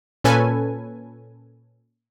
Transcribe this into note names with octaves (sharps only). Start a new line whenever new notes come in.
A#2 C#4 A4 B4 G#5